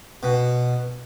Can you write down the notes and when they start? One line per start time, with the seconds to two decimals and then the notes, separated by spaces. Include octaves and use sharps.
0.23 B2